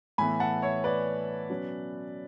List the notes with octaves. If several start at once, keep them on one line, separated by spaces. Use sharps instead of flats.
A2 E3 B3 G#5 B5
F#5 A5
C#5 E5
B4 D5
B2 F#3 C#4